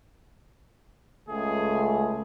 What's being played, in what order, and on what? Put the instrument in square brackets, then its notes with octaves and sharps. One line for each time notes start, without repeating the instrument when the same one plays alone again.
[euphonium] C#2 [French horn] A3 [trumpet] G#4